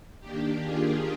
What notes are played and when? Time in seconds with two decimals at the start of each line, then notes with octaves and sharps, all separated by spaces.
0.20 D#3 A#3 D4 G4
0.61 F4 G#4